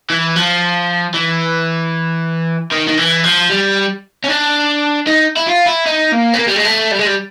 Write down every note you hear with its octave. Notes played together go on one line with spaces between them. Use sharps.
E3
F3
E3
D#3
D#3
E3
F3
G3
C#4
D4
D#4
E4
F4
E4
D#4
A#3
B3
A#3
G3
G#3
A3
G3
G#3
G3